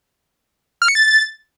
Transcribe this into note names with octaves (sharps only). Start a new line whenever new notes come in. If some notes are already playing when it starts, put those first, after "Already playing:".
F6
C#7
A6